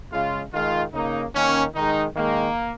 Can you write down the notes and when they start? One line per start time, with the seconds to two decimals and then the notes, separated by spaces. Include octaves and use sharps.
0.12 C#3 G#3 F4
0.53 D#3 G#3 F4
0.94 C#3 A#3 D#4
1.34 D#3 A#3 C#4
1.75 D#3 G#3 D#4
2.16 D#3 G#3 A#3